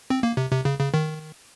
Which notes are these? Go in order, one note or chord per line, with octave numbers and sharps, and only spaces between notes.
C4
A#3
C3
C3
C#3
C#3
D#3